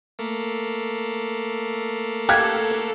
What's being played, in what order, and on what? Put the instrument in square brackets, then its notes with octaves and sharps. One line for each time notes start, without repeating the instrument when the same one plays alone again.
[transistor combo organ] A3 A#3
[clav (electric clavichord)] G4 F5 F#5 [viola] A4 [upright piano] G#6